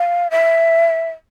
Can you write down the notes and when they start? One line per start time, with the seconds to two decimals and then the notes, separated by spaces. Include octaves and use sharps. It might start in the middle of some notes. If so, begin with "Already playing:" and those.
Already playing: F5
0.31 E5